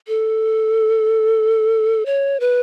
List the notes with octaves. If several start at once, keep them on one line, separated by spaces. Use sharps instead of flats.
A4
C#5
B4